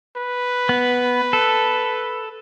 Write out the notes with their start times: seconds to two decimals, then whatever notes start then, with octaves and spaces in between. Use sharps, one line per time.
0.16 B4
0.69 B3
1.33 A4